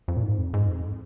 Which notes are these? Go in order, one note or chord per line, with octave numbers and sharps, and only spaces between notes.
F2
A#2
G#2
F2
G#2
F2